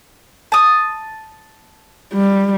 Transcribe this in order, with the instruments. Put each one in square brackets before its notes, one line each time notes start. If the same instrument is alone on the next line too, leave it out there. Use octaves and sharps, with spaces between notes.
[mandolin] A5 D#6
[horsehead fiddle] G3